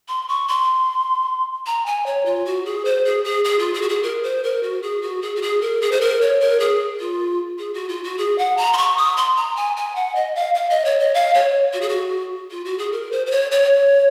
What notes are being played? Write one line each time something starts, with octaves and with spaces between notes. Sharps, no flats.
C6
C#6
C6
A#5
G#5
C#5
F4
F#4
G#4
C5
G#4
G#4
G#4
F4
G#4
F#4
G#4
A#4
C5
A#4
F#4
G#4
F#4
G#4
F#4
G#4
A#4
G#4
C5
A#4
C#5
A#4
G#4
F4
G#4
F#4
F4
F#4
G#4
F#5
A#5
C6
C#6
D#6
C6
A#5
G#5
G#5
F#5
D#5
F5
F5
D#5
C#5
D#5
F5
C#5
F#4
G#4
F#4
F4
F#4
G#4
A#4
C5
C5
C#5
C#5